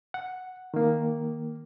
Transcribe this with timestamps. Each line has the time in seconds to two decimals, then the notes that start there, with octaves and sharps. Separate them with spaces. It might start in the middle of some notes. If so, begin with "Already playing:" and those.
0.14 F#5
0.74 D#3 A#3